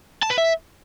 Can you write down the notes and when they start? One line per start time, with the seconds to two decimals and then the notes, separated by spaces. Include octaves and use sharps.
0.23 A5
0.30 B4
0.38 E5